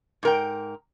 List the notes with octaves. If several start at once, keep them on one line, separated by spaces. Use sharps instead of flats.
G#2 A#4 G5